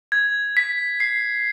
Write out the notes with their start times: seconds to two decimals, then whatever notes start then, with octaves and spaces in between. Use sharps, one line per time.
0.12 G#6
0.57 B6
1.00 C7